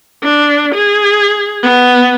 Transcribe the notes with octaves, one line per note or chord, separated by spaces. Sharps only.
D4
G#4
B3